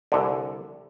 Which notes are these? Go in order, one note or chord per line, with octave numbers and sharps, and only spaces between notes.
C2 D3